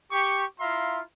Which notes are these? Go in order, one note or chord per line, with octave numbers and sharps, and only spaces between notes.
G4 C#6
E4 F4 E5 F5 A#5 C6